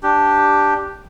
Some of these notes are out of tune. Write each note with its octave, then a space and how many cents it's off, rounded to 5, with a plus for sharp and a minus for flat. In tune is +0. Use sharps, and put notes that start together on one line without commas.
D4 +0 G4 +0